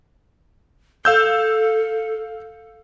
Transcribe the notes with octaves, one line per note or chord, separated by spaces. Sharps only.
A4 F5 E6 G6